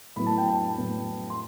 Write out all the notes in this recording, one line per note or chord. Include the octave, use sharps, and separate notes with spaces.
A2 F#3 B3 B5
A5
G5
A5
A2 F#3 B3
C6